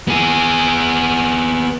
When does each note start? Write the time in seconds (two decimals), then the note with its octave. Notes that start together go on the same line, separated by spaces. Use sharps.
0.08 B3 G#4